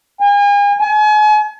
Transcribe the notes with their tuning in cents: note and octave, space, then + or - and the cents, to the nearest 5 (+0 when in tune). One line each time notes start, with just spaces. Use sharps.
G#5 -40
G#5 +40